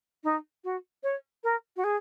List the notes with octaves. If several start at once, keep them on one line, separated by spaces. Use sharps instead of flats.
D#4
F#4
C#5
A#4
F#4
G#4